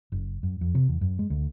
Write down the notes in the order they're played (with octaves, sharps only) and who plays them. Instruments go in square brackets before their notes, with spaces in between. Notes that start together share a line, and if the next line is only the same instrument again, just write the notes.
[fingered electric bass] F#1
F#2
F2
C3
E2
F#2
G#3
D2